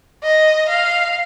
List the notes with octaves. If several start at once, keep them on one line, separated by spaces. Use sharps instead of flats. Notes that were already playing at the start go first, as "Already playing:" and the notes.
D#5
F5